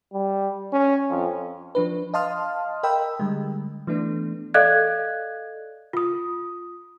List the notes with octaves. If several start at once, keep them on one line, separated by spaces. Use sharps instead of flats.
G3
C#4
F2
F3 D4 B4
D#5 F5 A5 C6 D#6 F6
A#4 D#5 G5 B5 E6
D3 G3 G#3
E3 A3 B3 D4
A4 D5 D#5 F5 F#6 G#6
F4 D#6